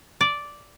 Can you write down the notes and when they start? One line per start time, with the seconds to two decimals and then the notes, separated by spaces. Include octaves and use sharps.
0.21 D5